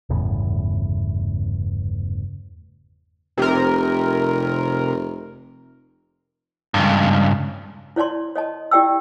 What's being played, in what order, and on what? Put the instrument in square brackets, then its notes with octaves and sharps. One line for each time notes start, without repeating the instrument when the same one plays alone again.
[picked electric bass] G1 E2 A2 C#3
[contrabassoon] F1 [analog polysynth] C3 A#4
[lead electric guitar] C#2 G2
[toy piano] E4 C#5 D5 A5 C6
C#5 D#5 A5
E4 G4 D5 G5 A5 E6